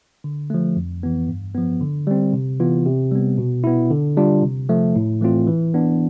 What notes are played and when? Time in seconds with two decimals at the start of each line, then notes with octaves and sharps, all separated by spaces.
0.24 D3
0.50 F3 A3
0.76 F2
1.03 E3 B3
1.29 G2
1.55 F3 B3
1.81 D3
2.07 G3 C4
2.33 C3
2.60 E3 B3 F4
2.86 C3
3.11 G3 B3
3.38 B2
3.64 B3 E4
3.91 D3
4.17 G3 D4 F4
4.43 C3
4.69 F3 A3
4.96 A2
5.21 E3 A3 C4 F4
5.47 E3
5.74 B3 D4